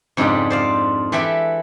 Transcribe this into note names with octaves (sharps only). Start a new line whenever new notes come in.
F2 G#2 C#3 D4 G4 G5
C5 D5 F5
E3 G4 A4 B4 E5 G5